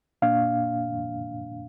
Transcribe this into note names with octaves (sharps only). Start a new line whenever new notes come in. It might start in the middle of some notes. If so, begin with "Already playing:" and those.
A#2 A#3 D4 F5